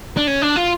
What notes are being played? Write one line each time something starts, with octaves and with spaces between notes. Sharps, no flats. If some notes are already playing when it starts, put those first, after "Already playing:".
D4
C#4
D4
F4